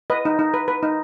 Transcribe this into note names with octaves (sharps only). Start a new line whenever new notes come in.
B4 D#5
D#4
D#4
B4
B4
D#4